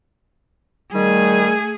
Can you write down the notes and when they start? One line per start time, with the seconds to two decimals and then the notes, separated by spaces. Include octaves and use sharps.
0.93 D#3 G3 A3 G#4 G#5